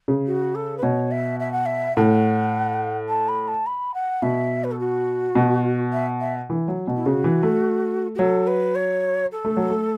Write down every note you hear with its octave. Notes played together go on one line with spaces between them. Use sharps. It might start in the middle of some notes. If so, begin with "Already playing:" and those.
C#3
F#4
A4
B4
B2 C#5
E5
E5
F#5
E5
A2 F#5
A5
B5
A5
B5
F#5
B2 E5
B4
A4
F#4
B2
E5
E5
E3
F#3
B2
E4
C#3 F#4
E3
A3
F#4
F#3 A4
B4
C#5
A4
A3
F#3
A3